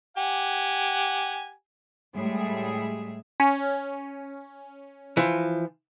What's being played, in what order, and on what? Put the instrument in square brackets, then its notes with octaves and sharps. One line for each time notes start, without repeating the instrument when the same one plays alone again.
[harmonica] G4 F#5 G#5
[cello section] A2 G3 G#3 G#4 E5
[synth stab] C#4
[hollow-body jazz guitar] E3 F3